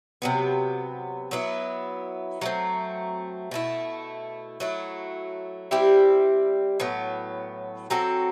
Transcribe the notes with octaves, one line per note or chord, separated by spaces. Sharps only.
C3 F#3 B3
F#3 B3 E4
F#3 A3 C4
B2 A3 E4
F#3 A3 E4
G3 C4 E4 G4
A2 F#3 B3
F#3 C4 F#4 A4